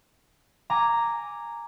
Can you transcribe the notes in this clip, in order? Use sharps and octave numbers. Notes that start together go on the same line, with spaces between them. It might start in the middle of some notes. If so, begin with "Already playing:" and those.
G#5 A#5 D6